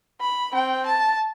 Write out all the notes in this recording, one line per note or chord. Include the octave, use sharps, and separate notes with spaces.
B5
C4 G5
A5